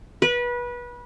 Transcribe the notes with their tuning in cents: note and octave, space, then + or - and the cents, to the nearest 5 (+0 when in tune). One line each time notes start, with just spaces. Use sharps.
B4 -25